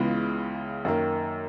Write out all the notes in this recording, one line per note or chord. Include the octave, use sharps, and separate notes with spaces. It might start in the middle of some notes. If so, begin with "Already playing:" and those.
Already playing: C#2 C#3 E3 G#3 B3
F#2 D#3 A#3